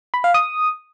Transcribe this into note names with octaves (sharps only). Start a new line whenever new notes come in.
B5
F5
D#6